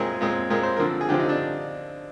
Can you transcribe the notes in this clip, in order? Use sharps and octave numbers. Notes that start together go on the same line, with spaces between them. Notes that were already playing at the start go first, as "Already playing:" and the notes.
Already playing: A#2 G#3 C4 G#4 A#4 G#5
A#2 G#3 C4
A#2 G#3 C4 A#4
C5
D3 F3 C4 A#4
G#4
D3 F3 C4 G4
D#4
D4